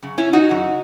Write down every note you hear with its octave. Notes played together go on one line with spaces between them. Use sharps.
F#2 C#3
C#4 E4
D#4 F#4
F#2 C#3